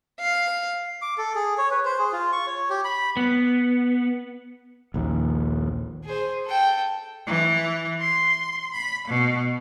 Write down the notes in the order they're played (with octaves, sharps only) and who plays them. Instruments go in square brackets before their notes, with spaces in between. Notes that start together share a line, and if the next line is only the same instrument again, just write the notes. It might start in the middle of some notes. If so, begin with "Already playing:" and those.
[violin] F5
[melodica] D6
A4
G#4
C#5
B4
C5
G#4
F4
C#6
C#5
G4
B5
[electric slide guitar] B3
[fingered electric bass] A#1 D#2
[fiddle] G#4 C5
A4 G5
[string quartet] E3
C6
B5
B2